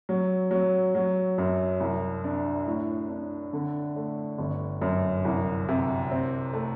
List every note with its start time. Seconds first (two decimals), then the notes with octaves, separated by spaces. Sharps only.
0.09 F#3
0.51 F#3
0.95 F#3
1.38 F#2
1.80 C2
2.24 D4
2.67 A2
3.09 D4
3.53 D3
3.96 A3
4.38 G1
4.82 F#2
5.25 C2
5.69 C3
6.11 C4
6.53 A3